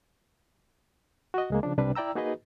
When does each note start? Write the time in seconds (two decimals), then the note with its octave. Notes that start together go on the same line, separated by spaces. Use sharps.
1.34 F#4 D#5
1.50 C#2 G#3 A#3
1.63 C#3 F3 D4
1.78 C2 C3 G3 D4 B4
1.95 E4 D5 G5 A#5 E6
2.15 A#3 D#4 F#4 G#4 B4 D#5